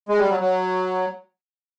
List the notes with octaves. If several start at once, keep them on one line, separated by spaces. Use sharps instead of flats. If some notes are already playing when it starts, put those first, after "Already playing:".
G#3
G3
F#3
F#3